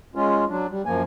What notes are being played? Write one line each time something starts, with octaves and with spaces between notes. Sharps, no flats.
G#3 C#4 F4
F#3 D4
G3
F#2 F3 A#3 G#5